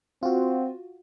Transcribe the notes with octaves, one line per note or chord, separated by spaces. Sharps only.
C4 F4 F#4